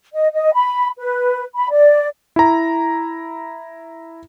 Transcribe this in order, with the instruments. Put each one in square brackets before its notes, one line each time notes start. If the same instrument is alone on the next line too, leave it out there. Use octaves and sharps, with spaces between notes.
[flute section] D#5
D#5
B5
B4
B5
D5
[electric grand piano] E4 A#5